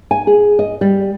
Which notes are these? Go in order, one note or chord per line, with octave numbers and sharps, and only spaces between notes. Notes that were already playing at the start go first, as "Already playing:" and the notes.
G#5
G#4
D#5
G3